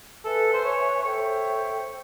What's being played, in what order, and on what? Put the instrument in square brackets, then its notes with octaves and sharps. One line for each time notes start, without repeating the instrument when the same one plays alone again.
[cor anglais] A4 [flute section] B4 E5 G#5
[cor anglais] C5
C#5
[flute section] A4 C5 E5 G5 [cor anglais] C#5